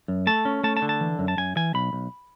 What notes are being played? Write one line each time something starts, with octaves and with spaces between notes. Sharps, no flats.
F#2
A3 A5
C#4
A3 A5
A5
D3
A5
E3
F#2
A5
F#2 G#5
E3 G#5
B1 B5
B1